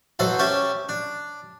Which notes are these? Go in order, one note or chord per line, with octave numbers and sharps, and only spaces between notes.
E3 F#3 A4 C5 D#5
C#4 G4 C#5 E5 G#5 A5
D4